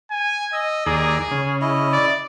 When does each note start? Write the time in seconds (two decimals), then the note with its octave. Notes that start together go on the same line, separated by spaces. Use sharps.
0.11 G#5
0.53 D#5 E6
0.86 D#2 G#4 D5 A#5
1.31 C#3
1.61 E4 D#5
1.93 D5